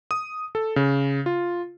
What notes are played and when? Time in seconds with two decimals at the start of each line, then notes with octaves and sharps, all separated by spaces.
0.11 D#6
0.55 A4
0.76 C#3
1.26 F4